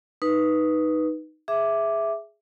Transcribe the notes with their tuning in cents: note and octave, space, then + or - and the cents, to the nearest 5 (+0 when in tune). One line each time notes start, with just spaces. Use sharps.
D#4 +0 B4 -5
G#4 +0 E5 +0 D6 +0